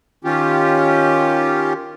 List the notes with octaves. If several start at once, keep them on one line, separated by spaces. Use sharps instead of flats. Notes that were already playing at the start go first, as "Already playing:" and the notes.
D#3 C#4 F4 G4